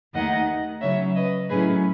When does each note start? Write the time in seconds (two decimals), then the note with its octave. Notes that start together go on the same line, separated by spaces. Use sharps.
0.14 D#2 D#3 A3 D#4 D#5 F#5
0.81 C#3 F#3 C#4 C#5 E5
1.15 B4 D#5
1.48 A2 F#3 A3 C#4 E4 G#4 B4